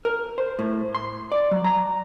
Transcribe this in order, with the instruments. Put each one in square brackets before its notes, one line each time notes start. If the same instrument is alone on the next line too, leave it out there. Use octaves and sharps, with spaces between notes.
[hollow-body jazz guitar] A#4
C5
A2
C6
D5
F#3
A#5